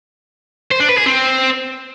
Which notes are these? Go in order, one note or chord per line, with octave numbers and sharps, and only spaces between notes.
C5
D4
B4
G#4
C4